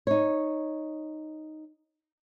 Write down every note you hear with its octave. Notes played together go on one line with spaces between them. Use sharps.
D#4 C#5